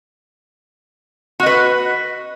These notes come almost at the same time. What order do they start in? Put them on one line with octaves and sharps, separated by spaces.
F#4 D#5 B4